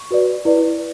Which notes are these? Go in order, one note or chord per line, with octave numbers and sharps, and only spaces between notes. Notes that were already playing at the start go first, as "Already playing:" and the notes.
Already playing: C#6
F#4 B4 D5
E4 B4 D5